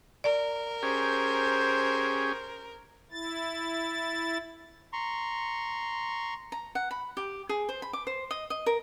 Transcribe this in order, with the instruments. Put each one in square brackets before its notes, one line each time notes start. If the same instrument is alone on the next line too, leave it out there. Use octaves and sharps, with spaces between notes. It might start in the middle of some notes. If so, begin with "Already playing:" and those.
[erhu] A#4 [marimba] D5
[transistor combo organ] C#4 G4 G#4 [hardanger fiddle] C5
[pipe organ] E4 A6
[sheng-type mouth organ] A#5 C6 C#6
[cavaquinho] A#5
F#5
B5
G4
G#4
C5
B5
D6
C5
D#5
D#5
A#4